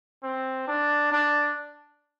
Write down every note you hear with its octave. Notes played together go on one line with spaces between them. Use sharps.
C4
D4
D4